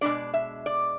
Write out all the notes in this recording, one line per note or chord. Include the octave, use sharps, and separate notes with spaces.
B2 G#3 B3 D4 D5
E5
D5